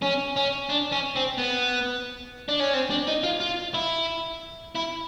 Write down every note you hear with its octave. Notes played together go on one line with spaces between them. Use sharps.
C#4
C#4
D4
C#4
C4
B3
D4
C#4
C4
D4
D#4
F4
F4
E4
E4